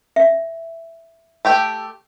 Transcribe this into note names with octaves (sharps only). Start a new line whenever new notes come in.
E5
A3 G4 G5